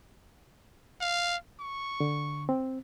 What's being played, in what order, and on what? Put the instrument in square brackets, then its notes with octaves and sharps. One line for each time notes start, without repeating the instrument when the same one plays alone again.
[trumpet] F5
C#6
[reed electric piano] D3
C4